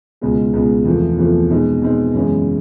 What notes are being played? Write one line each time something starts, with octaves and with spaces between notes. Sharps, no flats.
C#2 B2 G#3 B3
C#2 B2 G#3 B3
E2 C3 F3 A3
E2 C3 F3 A3
B2 G#3 C4 D#4
B2 G#3 C4 D#4
F#2 C#3 E3 G#3 B3